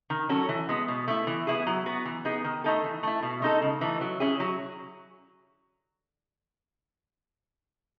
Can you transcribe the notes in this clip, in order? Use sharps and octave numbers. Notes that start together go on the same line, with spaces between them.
D#3
F#3 C#4 F#4 A4
E3
G#3 B3
B2
A3 E4
E3
B3 E4 G#4
F#3
B3 F#4
E3
B3 D#4 G#4
D#3
A3 D#4 A4
E3
A3 E4
B2
G#3 D#4 A4
C#3
E3 A3 D#4
F#3
C#4 E4 G#4
F#3